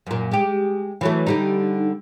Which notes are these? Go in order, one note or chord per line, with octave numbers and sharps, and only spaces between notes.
F#2 A#2
G#3 G4
E3 F#3 A3
D3 G3 D#4